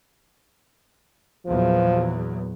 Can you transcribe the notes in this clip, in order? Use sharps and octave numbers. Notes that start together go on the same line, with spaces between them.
E2 A#2 F3 F#3